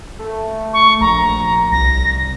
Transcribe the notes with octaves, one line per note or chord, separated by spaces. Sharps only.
A3
C#6
A#1 A#5
C2 A#6